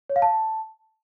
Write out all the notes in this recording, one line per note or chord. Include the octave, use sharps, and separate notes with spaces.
C#5
F5
A5